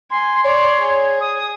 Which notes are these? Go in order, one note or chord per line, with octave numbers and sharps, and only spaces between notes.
G#5 C6
C#5 D5 C6
G#4
D#6